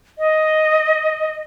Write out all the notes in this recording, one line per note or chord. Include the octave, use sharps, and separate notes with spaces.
D#5